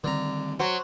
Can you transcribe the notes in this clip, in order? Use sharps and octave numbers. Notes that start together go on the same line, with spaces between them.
D3 D#3 G3 C4 A#5
F#3 C5